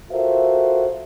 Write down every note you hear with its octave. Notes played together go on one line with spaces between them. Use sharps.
F4 F#4 A4 A#4 C5 E5